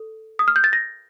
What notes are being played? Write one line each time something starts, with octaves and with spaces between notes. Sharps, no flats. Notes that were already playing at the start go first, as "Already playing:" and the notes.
Already playing: A4
D#6
F6
G6
A6
A#6